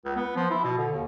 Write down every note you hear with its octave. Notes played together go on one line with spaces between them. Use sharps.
C#2
B3
F3
E4
B2
D3
D#2